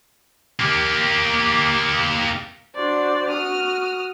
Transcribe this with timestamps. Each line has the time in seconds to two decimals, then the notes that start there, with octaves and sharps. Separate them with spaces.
0.60 A#3 G4
2.76 D4 F#4 C5 D5
3.30 F#4 D#6 F6